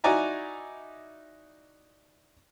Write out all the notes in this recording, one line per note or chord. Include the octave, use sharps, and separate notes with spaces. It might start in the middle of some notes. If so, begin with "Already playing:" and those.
D#4 E4 F#4 D5 G#5 A#5